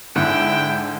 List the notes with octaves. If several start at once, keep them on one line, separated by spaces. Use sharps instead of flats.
G#2 D3 E4 G5 F#6